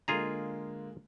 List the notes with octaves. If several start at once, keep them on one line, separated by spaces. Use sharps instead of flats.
D3 G#3 A#3 F4 G#4 A#5